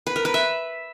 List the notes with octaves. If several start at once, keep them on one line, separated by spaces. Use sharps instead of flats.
B4
A#4
B4
E5